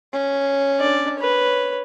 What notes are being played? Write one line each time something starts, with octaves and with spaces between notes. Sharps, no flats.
C#4
D4 D5
B4 C#5